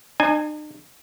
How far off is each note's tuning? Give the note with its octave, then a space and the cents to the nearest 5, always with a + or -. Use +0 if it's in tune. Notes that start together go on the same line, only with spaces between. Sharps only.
D#4 -45 G#5 +0